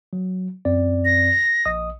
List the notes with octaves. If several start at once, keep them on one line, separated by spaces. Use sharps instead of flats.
F#3
F#2 C4 D5
A#6
A#1 D#5 D#6